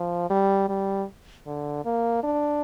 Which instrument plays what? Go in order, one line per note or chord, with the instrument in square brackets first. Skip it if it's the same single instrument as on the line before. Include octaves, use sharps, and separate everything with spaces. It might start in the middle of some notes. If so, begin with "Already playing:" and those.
Already playing: [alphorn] F3
G3
G3
D3
A#3
D4